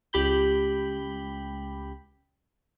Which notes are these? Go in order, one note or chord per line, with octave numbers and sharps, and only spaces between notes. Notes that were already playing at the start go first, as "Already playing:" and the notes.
C#2 G4 B5 G6